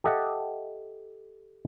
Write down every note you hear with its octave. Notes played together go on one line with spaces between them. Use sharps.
G4 A4 D#5 E5 F#5